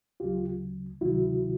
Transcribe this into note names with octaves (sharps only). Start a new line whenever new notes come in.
D2 C#3 F#3 F4 G4
D2 C3 D#3 F#3 E4 F#4